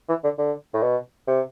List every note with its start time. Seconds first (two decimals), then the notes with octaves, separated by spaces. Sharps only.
0.09 E3
0.24 D3
0.38 D3
0.74 A2
0.83 B2
1.27 C3